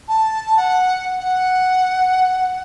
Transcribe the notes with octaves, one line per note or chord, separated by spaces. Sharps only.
A5
F#5
F#5